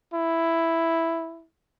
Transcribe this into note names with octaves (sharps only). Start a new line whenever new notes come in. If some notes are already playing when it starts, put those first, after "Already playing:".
E4